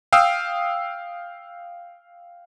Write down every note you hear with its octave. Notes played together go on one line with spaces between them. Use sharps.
F5 G5 D#6 E6